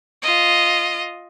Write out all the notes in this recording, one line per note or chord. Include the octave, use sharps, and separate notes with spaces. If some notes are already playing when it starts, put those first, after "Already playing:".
F4 D#5